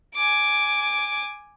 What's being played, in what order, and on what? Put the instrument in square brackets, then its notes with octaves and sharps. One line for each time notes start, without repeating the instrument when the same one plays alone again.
[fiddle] G#5 D6